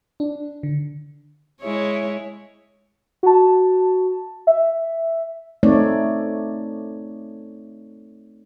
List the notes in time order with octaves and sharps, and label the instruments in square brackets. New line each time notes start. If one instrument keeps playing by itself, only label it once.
[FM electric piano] D4
D3
[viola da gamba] G#3 E4 C#5
[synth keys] F#4 A5
E5
[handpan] A3 C4 D#4 C#5 D5